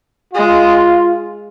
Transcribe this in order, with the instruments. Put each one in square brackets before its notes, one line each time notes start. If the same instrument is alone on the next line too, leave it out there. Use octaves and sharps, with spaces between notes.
[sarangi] G#3 [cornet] F4